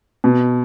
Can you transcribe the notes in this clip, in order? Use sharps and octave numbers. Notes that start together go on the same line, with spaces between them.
B2